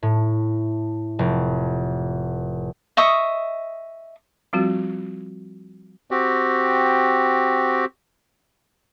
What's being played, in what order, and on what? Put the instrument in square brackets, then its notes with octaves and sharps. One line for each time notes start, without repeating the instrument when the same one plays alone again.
[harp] A2
F1
[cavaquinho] D#5 E5 C#6 D#6
[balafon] F3 G3 C4 F4 F#4
[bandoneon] C4 F#4 G4